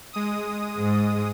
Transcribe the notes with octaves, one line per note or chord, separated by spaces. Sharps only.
G#3 D#6
G#2